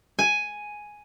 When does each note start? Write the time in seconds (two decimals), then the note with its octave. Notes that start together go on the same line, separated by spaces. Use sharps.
0.19 G#5